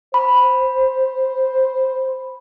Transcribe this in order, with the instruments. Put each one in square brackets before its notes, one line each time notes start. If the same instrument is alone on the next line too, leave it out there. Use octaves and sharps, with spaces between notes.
[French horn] C5 [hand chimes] B5